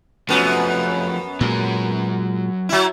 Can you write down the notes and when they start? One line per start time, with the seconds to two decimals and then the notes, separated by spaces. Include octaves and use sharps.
0.29 F#2 F3 A3 B3
1.41 A#2 F#3 G#3 A#4
2.69 F#3 E4